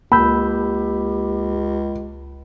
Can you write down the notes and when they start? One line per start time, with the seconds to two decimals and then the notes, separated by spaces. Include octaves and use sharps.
0.12 C#2 A#3 G4 B5 E6 G6